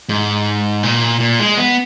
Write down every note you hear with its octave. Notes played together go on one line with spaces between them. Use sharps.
G#2
A#2
A#2
G#3
B3